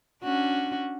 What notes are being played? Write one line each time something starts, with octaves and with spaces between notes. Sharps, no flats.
C#4 D4 F#4